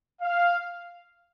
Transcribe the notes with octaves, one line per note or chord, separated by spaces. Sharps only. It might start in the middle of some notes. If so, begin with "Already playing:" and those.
F5